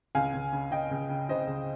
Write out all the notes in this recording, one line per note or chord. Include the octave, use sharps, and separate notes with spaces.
C#2 F5 G#5
C#2
C#3
C#3 D#5 G5
C#2
C#3
C#3 C5 D#5
C#2